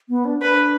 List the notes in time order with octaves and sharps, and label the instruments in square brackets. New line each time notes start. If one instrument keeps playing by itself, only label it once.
[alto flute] B3
D4
[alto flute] D4 [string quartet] B4